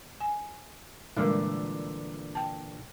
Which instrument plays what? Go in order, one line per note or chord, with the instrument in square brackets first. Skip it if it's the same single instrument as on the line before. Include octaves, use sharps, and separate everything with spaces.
[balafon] G#5
[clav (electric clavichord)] A#2 D3 E3 [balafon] G3 G#3 A#4
[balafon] G5 A5